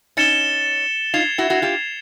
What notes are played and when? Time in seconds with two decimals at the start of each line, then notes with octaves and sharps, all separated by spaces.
0.17 C#4 D#4 A6 C#7 E7 G7
1.14 D#4 F4 G#6 C7 F7
1.38 E4 F#4
1.50 E4 F#4
1.62 F4 G4